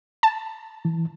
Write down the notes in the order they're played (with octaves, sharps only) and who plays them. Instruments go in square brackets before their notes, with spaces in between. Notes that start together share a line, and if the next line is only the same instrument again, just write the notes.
[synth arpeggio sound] A5
[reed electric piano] E3